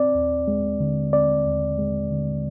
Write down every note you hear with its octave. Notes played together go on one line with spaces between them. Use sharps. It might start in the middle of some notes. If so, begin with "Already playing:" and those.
Already playing: C4 D5
D#2
G#3
D3
C4 D5
D#2
G#3
D3